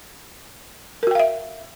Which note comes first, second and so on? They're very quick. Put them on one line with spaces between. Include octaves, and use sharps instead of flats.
A#4 F#4 G5 F5 E5